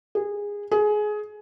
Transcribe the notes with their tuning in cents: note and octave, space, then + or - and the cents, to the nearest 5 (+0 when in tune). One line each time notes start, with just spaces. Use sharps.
G#4 -20
G#4 +20